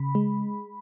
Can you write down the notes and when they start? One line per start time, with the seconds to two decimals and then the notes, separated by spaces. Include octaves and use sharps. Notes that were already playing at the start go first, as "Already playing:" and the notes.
Already playing: C#3 B5
0.15 G#3